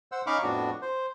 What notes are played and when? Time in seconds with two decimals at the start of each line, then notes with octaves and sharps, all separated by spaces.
0.12 C5 F#5 E6
0.27 C#4 D#4 F5 B5 C#6 D6
0.43 F2 A2 B3 D4 F#4
0.82 C5